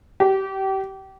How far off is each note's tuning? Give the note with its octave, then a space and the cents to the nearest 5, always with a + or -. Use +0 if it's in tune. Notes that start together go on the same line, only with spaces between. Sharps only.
G4 -30